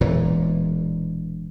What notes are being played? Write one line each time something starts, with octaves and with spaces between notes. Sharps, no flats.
E1 A#2 E3